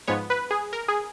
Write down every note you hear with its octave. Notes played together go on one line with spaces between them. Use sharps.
G#2 F3 G#3 B3 C#5
B4
G#4
A#4
G#4